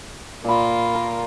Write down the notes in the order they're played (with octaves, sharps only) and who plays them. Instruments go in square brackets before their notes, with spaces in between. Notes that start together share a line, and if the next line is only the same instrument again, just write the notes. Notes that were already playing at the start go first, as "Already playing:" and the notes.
[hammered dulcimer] A#2 B5 [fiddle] A#3 F4
[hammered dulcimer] A#4